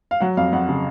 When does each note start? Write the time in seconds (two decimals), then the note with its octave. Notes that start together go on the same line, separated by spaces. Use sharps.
0.11 F5
0.20 F#3 F#5
0.37 F2 F5
0.52 F2 F#5
0.69 C#3